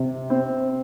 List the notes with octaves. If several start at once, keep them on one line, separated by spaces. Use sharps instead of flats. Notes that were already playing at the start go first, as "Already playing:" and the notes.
Already playing: C3
C4